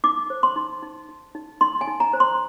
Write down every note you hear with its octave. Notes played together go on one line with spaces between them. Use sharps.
D#4 D6
C5
C6
D#4
D#4
D#4
D#4
D#4 C6
G#5
D#4
A#5
C5
C6